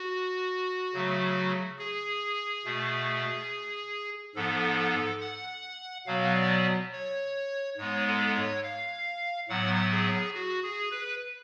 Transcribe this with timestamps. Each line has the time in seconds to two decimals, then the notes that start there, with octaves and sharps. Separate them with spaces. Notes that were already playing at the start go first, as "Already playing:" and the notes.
Already playing: F#4
0.93 C#3 F#3 A3
1.79 G#4
2.65 B2 A3
4.35 G#2 F3 B3 A4
5.21 F#5
6.06 B2 F#3 B3 F5
6.34 D5
6.93 C#5
7.77 G#2 G#3 B3 C#5
8.07 A4
8.34 C#5
8.63 F5
9.49 A2 F#3 B3 F#5
9.91 G#4
10.34 F#4
10.63 G#4
10.91 B4